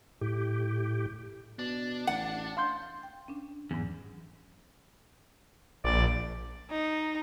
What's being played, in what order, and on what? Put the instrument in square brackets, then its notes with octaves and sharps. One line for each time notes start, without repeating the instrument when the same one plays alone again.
[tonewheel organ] A2 G4
[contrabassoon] B2 [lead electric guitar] D4
[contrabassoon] A1 [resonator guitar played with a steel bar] F#5
[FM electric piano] F5 C6 G6
[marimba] G5
C#4 D4
[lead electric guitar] E2 [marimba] G#2 F#3
[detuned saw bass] A#1 [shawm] D5
[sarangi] D#4